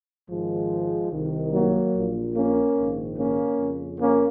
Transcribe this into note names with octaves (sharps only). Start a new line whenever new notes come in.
G#1 G#2 D#3 F3 G#3
C2 C3 D#3
F#3 A#3
A#1 A#2
A#3 C#4
A#1 G#2 D#3
A#3 C#4
F2 C#3
A#3 C#4